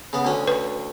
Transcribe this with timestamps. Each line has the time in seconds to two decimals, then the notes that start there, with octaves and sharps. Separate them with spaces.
0.13 C#3 B3
0.25 D2 C#4
0.48 B4